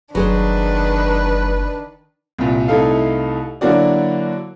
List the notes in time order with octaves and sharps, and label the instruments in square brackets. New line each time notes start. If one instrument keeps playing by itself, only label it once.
[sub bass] F#1 [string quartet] D#3 D4 [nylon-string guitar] F#3 G#4 C5 [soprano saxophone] B4
[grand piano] C2 A#2
C2 A3 D#4 E4 A4 F5
D3 F#3 A#3 E4 F#4 D5